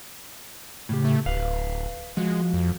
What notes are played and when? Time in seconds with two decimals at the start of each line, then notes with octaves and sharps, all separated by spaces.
0.89 A2 C#3 G4
1.05 A3
1.26 D1 B4 F5
2.17 F3 G#3 F#4
2.54 F2